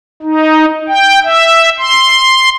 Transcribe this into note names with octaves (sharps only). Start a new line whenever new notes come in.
D#4
G5
E5
C6